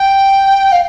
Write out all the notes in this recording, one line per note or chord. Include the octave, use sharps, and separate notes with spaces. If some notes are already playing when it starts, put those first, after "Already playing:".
Already playing: G5
F5